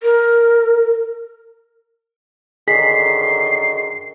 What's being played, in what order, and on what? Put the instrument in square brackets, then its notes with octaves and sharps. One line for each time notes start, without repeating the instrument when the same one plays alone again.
[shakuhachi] A#4
[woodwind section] F#2 D3 D#3 [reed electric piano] G#4 [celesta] B6 [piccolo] C7